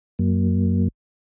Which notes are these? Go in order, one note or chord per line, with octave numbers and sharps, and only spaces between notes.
F#2 F#3 A#3